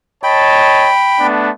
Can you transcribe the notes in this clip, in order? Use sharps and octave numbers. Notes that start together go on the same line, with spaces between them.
C#5 D#5 G5 A5 B5
A3 B3 D4